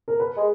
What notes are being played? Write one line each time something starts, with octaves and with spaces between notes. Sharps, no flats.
A#4
B4
G#3